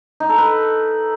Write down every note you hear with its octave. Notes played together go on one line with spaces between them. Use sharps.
D#4
A4
B4